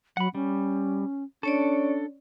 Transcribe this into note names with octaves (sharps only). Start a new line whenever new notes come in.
F#3 F#5 B5
G3 C#4
C#4 D4 A4 C#5 D5